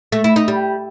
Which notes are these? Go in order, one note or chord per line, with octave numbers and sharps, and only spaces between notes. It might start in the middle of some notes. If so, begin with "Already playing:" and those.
A3
E4
D#4
G3